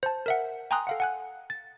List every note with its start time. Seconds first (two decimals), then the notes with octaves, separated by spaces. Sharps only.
0.03 C5 A5
0.26 A#4 E5 F#5
0.71 G5 G#5 A#5 C6 D#6 F#6
0.87 A4 F5 F#5
1.00 F#5 G#5 F#6
1.50 A6